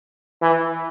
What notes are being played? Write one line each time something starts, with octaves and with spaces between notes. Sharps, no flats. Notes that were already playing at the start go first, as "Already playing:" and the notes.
E3